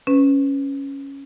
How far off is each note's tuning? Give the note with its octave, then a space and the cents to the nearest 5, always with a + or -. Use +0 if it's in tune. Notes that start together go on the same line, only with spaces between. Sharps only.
C#4 +0 B4 +15